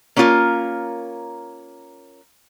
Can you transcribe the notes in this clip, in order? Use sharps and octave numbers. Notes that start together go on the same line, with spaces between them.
A#3 C#4 F4 A#4